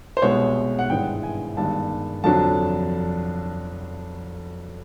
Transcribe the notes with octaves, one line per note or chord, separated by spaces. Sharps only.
C5
C2 B2 G#3 C#5
F#5
G#1 G2 E3 G#3 G5
G#5
G1 G2 D#3 G#3 A5
F1 F2 D3 F#3 A5